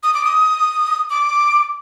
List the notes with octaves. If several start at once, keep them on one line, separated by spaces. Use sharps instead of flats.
D#6
D6
D#6
D6